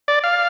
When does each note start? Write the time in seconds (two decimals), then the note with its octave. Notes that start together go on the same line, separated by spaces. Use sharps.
0.08 D5
0.24 F5